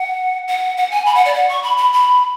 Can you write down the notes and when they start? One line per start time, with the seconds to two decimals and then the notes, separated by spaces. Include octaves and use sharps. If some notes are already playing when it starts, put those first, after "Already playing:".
Already playing: F#5
0.48 F#5
0.77 F#5
0.91 G#5
1.06 B5
1.15 F#5
1.25 D5
1.34 F#5
1.49 C#6
1.63 B5
1.77 B5
1.93 B5